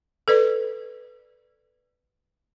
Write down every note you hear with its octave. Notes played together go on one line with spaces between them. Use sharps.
A4 B4 D5